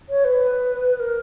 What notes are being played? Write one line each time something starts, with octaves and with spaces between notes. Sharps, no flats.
C#5
B4
A#4